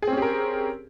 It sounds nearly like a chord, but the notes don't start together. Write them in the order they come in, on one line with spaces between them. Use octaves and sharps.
G#4 C4 C#4 G4 A#4